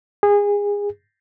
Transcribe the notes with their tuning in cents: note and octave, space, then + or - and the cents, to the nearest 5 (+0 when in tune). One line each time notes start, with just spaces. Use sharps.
G#4 -25